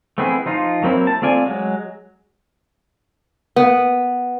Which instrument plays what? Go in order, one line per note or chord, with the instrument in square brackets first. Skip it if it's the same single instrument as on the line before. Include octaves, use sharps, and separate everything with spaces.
[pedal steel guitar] A3 B3 C4 E4 G#4
F3 D#4 F4
F#3 A#3 C4 E4
A5
A3 C4 F4 D5 G#5
F#3 G#3
[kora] B3